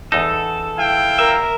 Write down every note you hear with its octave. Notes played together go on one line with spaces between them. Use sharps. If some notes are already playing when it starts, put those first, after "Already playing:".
E2 D#4 A4
E4 F5 G5
A#4 E5